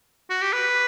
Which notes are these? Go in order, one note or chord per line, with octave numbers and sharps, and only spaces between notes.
F#4
G4
B4